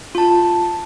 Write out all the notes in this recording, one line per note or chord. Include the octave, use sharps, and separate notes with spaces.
F4 A5